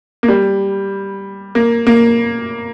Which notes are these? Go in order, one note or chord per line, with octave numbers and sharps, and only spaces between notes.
A#3
G3
A#3
A#3